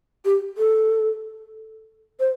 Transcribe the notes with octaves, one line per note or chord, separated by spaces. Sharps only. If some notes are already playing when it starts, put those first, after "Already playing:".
G4
A4
C5